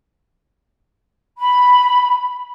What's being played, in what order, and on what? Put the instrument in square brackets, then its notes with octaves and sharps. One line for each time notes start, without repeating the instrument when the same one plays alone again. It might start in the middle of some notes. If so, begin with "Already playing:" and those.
[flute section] B5